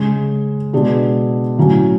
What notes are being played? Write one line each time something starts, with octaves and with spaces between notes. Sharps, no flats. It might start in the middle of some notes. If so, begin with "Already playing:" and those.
Already playing: C#3 G#3 C#4
B2 G#3 D4
A2 F#3 C#4